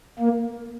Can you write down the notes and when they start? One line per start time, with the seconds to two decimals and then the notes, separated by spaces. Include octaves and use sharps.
0.19 A#3